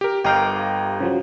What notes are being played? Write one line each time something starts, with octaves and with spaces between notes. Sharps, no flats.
G4 A#4
G1 G4 D#5 F5 G5 A#5
C#3 F3 F#3